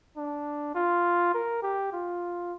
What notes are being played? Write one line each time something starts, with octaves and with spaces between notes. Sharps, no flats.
D4
F4
A#4
G4
F4